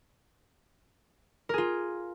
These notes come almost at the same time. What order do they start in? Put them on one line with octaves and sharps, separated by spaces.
A#4 G#4 F4